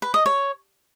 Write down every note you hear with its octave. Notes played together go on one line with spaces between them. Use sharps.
B4
D#5
C#5